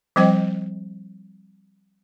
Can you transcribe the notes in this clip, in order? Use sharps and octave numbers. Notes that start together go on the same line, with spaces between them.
F3 G3 C4 C5 D#5 G5